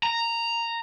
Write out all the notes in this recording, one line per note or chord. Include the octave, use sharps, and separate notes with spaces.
A#5